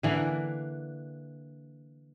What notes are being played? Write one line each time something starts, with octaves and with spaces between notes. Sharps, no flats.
D3 E3 A#3